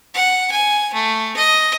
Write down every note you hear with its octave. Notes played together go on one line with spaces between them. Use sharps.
F#5
G#5
A3
D#5